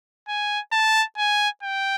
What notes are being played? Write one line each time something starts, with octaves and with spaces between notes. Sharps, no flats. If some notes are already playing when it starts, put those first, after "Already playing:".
G#5
A5
G#5
G5